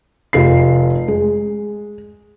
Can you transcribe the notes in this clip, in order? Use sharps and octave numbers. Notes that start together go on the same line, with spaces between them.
F1 F4 C7
G#3